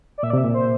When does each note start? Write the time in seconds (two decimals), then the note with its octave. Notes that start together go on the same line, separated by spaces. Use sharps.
0.18 D5
0.23 A#2 E5
0.30 D5
0.33 C3
0.38 E5
0.44 A#2
0.54 C5